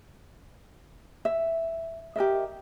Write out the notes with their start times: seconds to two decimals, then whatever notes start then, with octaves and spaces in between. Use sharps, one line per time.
1.25 E5
2.16 G4 A#4 D#5 E5